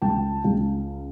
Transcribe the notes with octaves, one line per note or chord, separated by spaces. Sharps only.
C#2 G5 A5
C#2